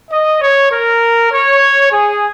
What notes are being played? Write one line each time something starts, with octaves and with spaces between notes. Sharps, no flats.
D#5
C#5
A#4
C#5
G#4